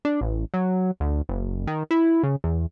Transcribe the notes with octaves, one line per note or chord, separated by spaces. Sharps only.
D4
A1
F#3
D2
F#1
D#3
E4
C#3
E2